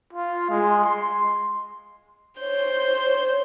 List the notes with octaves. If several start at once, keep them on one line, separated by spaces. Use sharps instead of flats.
F4
G#3
C6
C5 C#5 G6